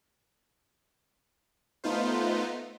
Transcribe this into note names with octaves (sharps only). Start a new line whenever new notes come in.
A3 B3 D#4 F4 C5